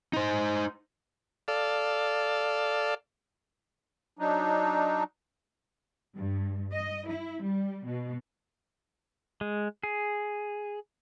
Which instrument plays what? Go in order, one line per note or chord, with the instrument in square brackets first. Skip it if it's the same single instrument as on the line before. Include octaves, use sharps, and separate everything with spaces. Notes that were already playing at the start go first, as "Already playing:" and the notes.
[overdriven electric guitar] D#4 C5
[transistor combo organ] A4 D5 F5
[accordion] F#3 D4 D#4
[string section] G2
D#5
E4
G3
B2
[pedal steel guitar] G#3
G#4